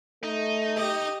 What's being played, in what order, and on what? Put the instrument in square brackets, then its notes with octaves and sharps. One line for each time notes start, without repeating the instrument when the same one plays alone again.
[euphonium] A3 [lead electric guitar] D#4
[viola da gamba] G4 D#5